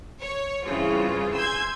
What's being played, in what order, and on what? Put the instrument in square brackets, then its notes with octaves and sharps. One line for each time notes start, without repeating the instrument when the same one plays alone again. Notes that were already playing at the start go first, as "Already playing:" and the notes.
[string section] C#5
G2 C#3 E3 C4 F4
G#5 C6 E6 G6 G#6